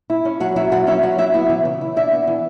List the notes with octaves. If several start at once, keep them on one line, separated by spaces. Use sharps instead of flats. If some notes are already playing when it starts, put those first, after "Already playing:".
E4
C#4
F#3 F#4 F#5
F#3 E4 E5
E4 F#4 F#5
C#4 E4 E5
F#3 F#4 F#5
F#3 E4 E5
B3 E4 E5
E3
C#3
E4
D4 E4 E5
B3
E3